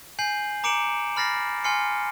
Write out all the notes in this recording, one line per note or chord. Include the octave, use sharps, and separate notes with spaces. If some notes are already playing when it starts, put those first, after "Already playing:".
G#5 G6 C7 F#7
A#5 D6 C#7 D7 E7 F#7
B5 F6 A6 A#6 C7
G#5 C6 F6 C7 C#7